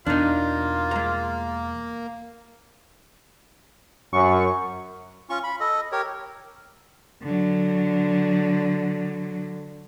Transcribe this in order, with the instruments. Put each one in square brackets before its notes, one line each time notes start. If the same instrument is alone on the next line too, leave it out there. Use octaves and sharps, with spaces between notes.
[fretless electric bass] E2 B2 [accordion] A#3 [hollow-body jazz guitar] D4 D#4 [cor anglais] F4
[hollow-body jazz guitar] G#3 A#5
[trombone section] F#2 [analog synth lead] C#6
[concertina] C#4 F4 C#6
B5
A4 D#5
G4 A#4 C#5
[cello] D3 F#3